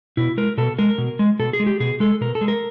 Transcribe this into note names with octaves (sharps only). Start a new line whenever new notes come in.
B2 E4
G#3 A#4
B2 A4
G#3 A#4
B2
G#3
B2 A4
G#4
G#3
G4
B2 G#4
G#3 A4
B2 A#4
A4
G#3
A#4